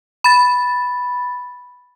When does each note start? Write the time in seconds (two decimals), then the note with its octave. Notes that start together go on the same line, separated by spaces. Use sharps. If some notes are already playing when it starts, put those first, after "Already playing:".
0.24 B5 A6